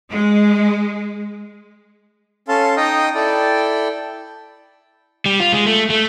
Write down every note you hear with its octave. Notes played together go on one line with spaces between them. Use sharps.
G#3
C#4 A4 F5 A5 C6
D#4 D#5 G5 A#5 D#6
E4 A4 D5 G5
G3
F4
G#3
A3
A3